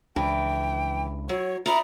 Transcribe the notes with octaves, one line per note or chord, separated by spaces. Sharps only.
C#2 E3 D4 G5
F#3 C#5
D#4 E4 D5 A#5